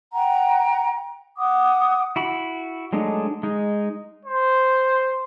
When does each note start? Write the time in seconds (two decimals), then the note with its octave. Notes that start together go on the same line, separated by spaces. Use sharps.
0.14 F#5 G5 A#5
1.36 F#5 D6 D#6
2.16 E4 F#4 B5
2.93 F#3 G#3 A3 D4 D#4
3.43 G#3 D#4
4.25 C5